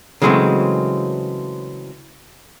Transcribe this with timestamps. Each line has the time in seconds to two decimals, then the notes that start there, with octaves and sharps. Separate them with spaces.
0.22 C#3 E3 F#3 G#3 A3 C4